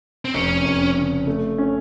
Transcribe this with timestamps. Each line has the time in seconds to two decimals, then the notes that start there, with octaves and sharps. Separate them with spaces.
0.25 C4
0.34 F1 C#4
0.65 F1
0.97 C#3
1.27 A3
1.58 C#4